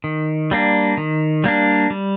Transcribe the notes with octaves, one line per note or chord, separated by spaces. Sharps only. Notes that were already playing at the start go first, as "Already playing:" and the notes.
D#3
G3 A#3 D4
D#3
G3 A#3 D4
G3